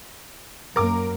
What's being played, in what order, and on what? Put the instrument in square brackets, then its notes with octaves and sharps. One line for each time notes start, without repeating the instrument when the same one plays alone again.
[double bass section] F#2 A#3 [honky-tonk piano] A#4 D6